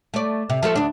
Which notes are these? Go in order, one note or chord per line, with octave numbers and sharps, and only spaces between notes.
A3 D5
C3
F3 A3 A4
D2 D4